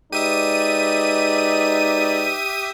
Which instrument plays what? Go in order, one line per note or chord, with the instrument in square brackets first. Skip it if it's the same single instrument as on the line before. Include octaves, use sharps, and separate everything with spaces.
[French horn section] G#3 B4 D5 [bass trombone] D#4 [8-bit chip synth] G4 E5 D#6 [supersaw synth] D#7